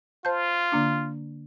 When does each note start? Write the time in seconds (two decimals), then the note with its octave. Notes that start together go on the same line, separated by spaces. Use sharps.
0.25 F4 C5 A5 G6
0.72 D3 A#3 D4